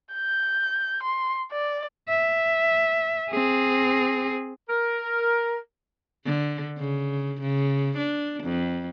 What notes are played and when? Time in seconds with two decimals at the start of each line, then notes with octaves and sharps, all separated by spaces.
0.14 G6
1.03 C6
1.52 D5
2.09 E5
3.31 C4 G#4
4.69 A#4
6.25 D3
6.78 C#3
7.41 C#3
7.98 D4
8.43 F2